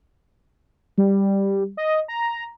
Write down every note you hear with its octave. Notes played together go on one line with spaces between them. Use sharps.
G3
D#5
A#5